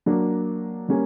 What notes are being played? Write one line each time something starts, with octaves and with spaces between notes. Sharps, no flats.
F#3 A#3 D4
G3 A#3 C#4